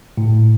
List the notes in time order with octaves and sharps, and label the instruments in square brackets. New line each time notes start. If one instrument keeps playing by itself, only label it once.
[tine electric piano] A2